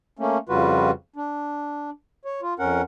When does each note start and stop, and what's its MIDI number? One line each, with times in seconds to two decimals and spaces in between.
0.19 0.38 57
0.19 0.38 58
0.19 0.38 61
0.49 0.91 41
0.49 0.91 49
0.49 0.91 55
0.49 0.91 65
0.49 0.91 66
0.49 0.91 71
1.16 1.90 62
2.25 2.41 73
2.42 2.54 65
2.59 2.82 41
2.59 2.82 61
2.59 2.82 70
2.59 2.82 78